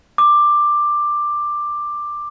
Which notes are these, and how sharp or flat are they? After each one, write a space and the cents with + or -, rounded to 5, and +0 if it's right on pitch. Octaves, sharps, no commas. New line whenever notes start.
D6 +10